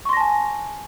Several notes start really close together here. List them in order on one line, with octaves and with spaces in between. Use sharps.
C#6 C6 A#6 A5 G#5